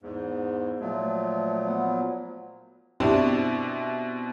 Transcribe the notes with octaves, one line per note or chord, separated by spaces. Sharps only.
E2 G#2
A#2 F3 F#3 A3
B3
B2 C4 D4 E4 G4